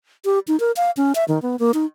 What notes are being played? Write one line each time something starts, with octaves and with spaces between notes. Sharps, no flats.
G4
D#4
A#4
F5
C#4
E5
D#3
B3
A#3
D#4